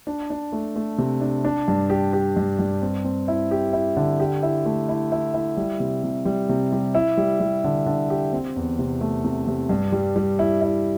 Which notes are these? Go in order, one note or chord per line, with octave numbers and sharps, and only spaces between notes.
D4
D4
A3
A3
C3
D4
D4
G2
G4
G4
G2
G2
C4
C4
E4
G4
E4
D3
G4
E4
A3
E4
E4
E4
G3
C3
C3
G3
C3
G3
E4
G3
G3
D3
D3
G4
C4
E2
C3
A3
C3
C3
G2
G3
G3
E4
E4